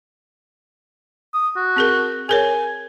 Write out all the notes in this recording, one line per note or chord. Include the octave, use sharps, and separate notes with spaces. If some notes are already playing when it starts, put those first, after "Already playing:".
D#6
F#4
C4 G#4 A#4
G#4 A#4 C#5 G#5